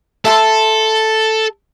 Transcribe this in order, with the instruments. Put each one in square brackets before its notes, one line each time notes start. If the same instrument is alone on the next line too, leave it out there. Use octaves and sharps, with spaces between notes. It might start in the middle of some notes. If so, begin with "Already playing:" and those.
[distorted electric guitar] A4 [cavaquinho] E5 A5 C6